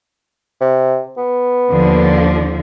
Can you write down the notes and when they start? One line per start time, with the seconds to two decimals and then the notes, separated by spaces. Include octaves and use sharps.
0.61 C3
1.18 B3
1.71 D#2 D3 F3